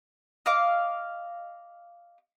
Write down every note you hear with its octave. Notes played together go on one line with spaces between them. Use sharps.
D#5 F5 D6